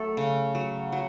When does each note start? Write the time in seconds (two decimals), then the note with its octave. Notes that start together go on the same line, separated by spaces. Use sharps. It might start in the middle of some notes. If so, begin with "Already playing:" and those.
Already playing: F#3 A3 A4
0.17 C#3
0.55 F#3
0.92 F#3